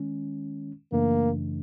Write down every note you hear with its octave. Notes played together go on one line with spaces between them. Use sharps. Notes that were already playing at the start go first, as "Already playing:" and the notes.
Already playing: D#3 G#3 C#4
F#2 C#3 E3 A3 A#3 D4